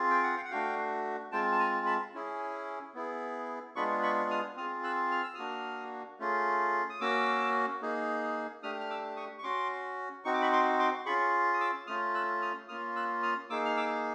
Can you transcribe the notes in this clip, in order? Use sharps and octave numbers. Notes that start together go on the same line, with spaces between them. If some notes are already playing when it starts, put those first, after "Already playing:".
Already playing: C4 F4 G#4
G5
F#5
F5 G5
F#5
A3 D4 F#4 F5 G5
G#3 C4 F4 G5 A5
A5
G#5 A#5
A5 B5
C#4 E4 G#4
B3 E4 G#4
G#3 B3 D4 F4 G#4 B5 C#6
B5 C#6
D#6 F6
C4 F4 G#4 D#6 F6
E6 F#6
F6
E6
A#3 D4 F#4 D#6 F6
A3 C#4 F4 G#4
D#6
A#3 C#4 F#4 D6 E6
A#3 D#4 G#4
A3 D4 G4 D#6 F6
F6
D6 E6
C#6 D#6
C#6
C#4 F#4 C6 D6
C4 D#4 F#4 C#6
D6
B5 C#6
C6 D6
C6 D6
C#4 F4 G#4 B5 C#6
D#6
D6 E6
A3 C#4 F4 D#6 F6
E6 F#6
D#6 F6
A#3 C#4 F4 D#6 F6
E6 F#6
D#6 F6
A#3 D#4 G#4 D6 E6
F6
D6 E6